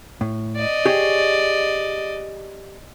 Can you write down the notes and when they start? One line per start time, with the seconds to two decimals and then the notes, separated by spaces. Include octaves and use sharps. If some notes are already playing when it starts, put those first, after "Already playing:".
0.21 A2
0.56 D5 D#5
0.86 G4 G#4 C#5